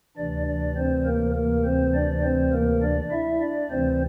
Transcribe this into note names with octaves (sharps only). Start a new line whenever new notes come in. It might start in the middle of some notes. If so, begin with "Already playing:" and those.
D2 C3 E3 D4 D5
D4 D5
C4 C5
A#3 A#4
A#3 A#4
C4 C5
D4 D5
C4 C5
A#3 A#4
D4 D5
E4 E5
D4 D5
D2 C3 E3 C4 C5